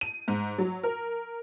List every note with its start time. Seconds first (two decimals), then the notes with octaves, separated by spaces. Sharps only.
0.01 D#7
0.28 G#2
0.58 F#3
0.83 A#4